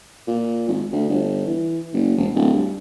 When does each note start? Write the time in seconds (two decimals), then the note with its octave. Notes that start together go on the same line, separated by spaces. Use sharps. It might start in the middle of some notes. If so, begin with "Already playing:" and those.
0.27 A#2
0.68 G#1
0.92 D2
1.09 G1
1.46 E3
1.94 F#1
2.17 E1
2.34 D1
2.54 G2